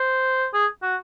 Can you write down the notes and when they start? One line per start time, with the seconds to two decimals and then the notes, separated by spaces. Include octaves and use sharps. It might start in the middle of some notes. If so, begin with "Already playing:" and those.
Already playing: C5
0.53 G#4
0.83 F#4